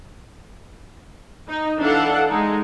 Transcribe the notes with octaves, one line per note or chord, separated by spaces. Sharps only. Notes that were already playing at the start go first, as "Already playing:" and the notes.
D#4
E3 D4 A4 F5 F#5
G#3 D#4